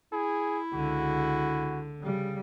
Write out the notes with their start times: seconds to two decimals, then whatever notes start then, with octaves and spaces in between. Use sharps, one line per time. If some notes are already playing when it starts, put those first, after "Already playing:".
0.13 E4 G#4
0.74 C#2 D3 F#4
2.01 C#3 G3